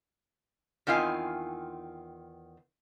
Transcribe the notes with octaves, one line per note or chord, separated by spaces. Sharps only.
E2 D#3 C4 F4 F5 G#5